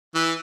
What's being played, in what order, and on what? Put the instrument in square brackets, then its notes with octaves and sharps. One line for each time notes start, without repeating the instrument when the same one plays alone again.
[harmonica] E3